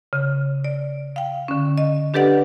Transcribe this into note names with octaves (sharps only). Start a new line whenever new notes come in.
C#3
D5
F5 G5
D3 C#4
D#5
D4 G4 A4 B4 D5 F#5